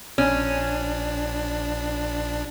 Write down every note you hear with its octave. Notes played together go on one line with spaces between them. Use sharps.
A#1 C#4 D4